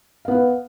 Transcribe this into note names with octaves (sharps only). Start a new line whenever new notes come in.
B3 B4 F5